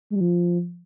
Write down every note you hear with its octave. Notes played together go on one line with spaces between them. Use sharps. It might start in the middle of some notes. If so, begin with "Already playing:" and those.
G#3
G3
F3